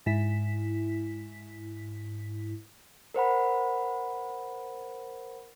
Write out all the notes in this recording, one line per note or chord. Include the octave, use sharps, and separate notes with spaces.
G#2 E4 B6
A#4 C5 F#5 B5